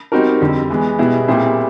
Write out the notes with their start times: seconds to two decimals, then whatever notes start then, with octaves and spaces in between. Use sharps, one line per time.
0.12 G3 C4 D#4 F#4 A#4
0.41 F2 D3 G3
0.70 E3 G#3 B3
0.98 B2 G3 B3 E4 G#4
1.28 A#2 G3 C4 E4 G#4